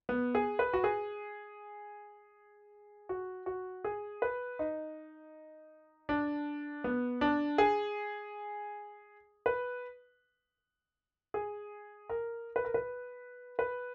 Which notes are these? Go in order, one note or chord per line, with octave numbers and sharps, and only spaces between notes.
B3
G#4
B4
F#4
G#4
F#4
F#4
G#4
B4
D#4
D4
B3
D4
G#4
B4
G#4
A#4
B4
A#4
B4
B4